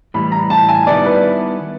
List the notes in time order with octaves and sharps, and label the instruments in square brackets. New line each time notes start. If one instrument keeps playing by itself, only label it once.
[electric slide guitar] A2 E3 G3 [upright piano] B5
[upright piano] A#5
A5
G#5
[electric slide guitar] D#3 G3 B3 E4 [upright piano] D5
[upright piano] B4